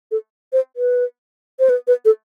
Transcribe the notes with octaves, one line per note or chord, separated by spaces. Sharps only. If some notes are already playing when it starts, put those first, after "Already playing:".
A4
C5
B4
C5
B4
B4
A4